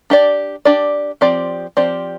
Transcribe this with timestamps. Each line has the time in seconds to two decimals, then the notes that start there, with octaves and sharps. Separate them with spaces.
0.10 D4 G4 D5
0.65 D4 G4 D5
1.21 F3 C4 G4 D5
1.77 F3 C4 G4 D5